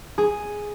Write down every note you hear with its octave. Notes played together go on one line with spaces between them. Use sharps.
G#4